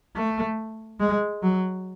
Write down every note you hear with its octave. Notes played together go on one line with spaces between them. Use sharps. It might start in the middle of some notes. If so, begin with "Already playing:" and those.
A3
G#3
F#3